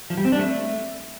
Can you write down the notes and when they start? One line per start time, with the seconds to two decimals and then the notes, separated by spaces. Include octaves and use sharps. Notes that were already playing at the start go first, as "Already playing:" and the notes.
0.10 F3
0.17 G3
0.25 C4
0.32 D4
0.39 A3